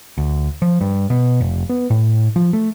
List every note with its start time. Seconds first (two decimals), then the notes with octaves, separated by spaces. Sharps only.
0.18 D2
0.62 F3
0.81 G2
1.10 B2
1.40 F1
1.69 B3
1.90 A2
2.36 F3
2.53 A3